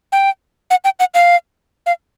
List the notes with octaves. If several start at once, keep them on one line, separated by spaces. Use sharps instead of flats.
G5
F#5
G5
F#5
F5
F5